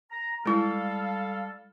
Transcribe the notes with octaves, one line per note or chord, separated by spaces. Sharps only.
A#5
G3 G#3 E4 A4 F5